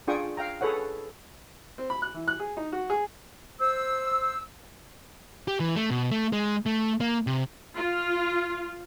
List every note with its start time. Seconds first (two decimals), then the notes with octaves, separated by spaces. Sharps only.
0.08 D4 F4 G#4 G5 C#6 D#6
0.37 F5 G5 A#5
0.61 G#4 A4 B4 C#5 F#5
1.78 C4
1.90 B5
2.02 F#6
2.14 E3
2.28 F#6
2.40 G#4
2.57 D#4
2.73 F#4
2.90 G#4
3.60 C5 E6
5.48 G4
5.60 E3
5.76 A3
5.90 B2
6.11 A3
6.33 G#3
6.66 A3
7.01 A#3
7.27 C3
7.77 F4